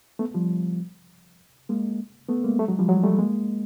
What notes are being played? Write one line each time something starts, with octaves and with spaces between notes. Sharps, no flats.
A3 B3
F3 G3
G#3 A#3
A3 B3
G#3 A#3
G3 A3
F#3 G#3
F3 G3
F#3 G#3
G3 A3
G#3 A#3